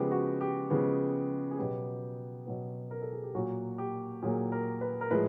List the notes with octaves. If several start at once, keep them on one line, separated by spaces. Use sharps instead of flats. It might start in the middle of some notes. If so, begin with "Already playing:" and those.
Already playing: C#3 F3 G#3 B3 G4
F#4
G4
C#3 F3 G#3 B3
G#4
B2 F#3 B3 G4
B2 F#3 B3
A#4
A4
G#4
G4
A#2 F#3 A#3 F#4
G4
A#2 F#3 A#3 G#4
A#4
B4
A#4
A2 F3 G#3 B4